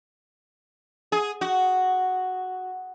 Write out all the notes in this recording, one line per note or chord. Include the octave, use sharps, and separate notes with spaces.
G#4
F#4